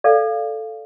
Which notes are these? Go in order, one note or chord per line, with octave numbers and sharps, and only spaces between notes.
A4 D5 F5